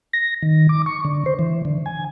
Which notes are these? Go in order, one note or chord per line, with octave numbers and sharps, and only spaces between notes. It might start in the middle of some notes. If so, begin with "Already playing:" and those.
A#6
D#3
D6
C#6
D3
C5
E3
D3
G#5